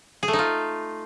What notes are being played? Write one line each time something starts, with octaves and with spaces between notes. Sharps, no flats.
G#4
A3
D#4
F4